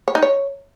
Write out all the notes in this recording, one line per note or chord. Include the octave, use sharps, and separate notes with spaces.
C#5
D#4
C#5